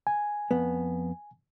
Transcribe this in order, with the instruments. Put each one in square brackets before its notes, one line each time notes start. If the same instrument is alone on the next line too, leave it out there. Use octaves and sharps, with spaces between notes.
[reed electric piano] G#5
[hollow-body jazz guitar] F2 B3